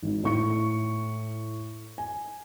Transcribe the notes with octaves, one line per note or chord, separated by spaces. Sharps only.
G#1 D#3
A2 C#6 C#7
G#5